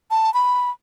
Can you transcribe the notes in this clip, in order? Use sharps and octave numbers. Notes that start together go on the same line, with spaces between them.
A5
B5